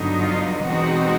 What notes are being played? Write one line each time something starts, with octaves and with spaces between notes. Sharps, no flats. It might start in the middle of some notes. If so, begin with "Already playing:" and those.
Already playing: G2 D3 F#3 B3 D#4
F4
E2 B2 G#3 C4 D#4 F#4